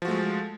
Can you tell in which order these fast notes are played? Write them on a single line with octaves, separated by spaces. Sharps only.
F3 F#4 A3 G#3